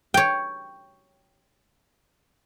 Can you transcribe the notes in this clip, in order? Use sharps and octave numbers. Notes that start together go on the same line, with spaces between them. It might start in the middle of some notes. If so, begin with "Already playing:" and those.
C#5 G5